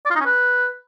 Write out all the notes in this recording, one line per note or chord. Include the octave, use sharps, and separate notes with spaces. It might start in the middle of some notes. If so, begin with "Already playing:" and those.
D5
F4
D#4
C#4
B4